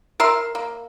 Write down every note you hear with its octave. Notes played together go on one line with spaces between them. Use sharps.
A#4 E5 C6
A#3